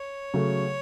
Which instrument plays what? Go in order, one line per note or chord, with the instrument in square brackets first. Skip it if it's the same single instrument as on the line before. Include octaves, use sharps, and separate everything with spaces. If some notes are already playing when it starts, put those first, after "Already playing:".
Already playing: [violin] C#5
[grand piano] C#3 F#3 A3